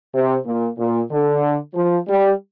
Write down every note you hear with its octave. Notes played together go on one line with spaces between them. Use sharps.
C3
A#2
A#2
D3
F3
G3